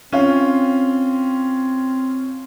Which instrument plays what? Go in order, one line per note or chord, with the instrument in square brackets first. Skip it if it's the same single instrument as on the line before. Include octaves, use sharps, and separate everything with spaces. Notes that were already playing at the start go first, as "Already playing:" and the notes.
[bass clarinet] C4 [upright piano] C#4 F4